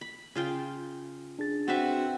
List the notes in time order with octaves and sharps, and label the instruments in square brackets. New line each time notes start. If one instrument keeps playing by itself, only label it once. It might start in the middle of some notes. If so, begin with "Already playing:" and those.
[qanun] B5
C#3 F4 G5
[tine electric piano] D4 G#4 A6
[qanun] C4 B4 E5 [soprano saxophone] F#4